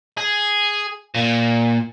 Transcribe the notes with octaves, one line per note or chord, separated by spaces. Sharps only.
G#4
A#2